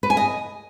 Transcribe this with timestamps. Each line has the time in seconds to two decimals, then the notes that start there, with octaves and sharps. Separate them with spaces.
0.03 B4
0.10 G#5
0.17 D#5